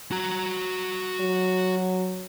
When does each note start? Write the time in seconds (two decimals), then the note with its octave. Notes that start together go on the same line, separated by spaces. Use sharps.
0.11 F#4 A#5
1.21 F#3